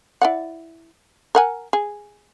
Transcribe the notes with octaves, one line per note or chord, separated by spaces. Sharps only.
E4 D5 F#5
A#4 F#5 G#5
G#4